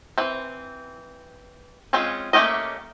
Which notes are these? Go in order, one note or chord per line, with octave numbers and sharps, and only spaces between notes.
E3 C4
G#3 C4 C#4 F4 G#4
A3 A#3 C#4 G4 D#5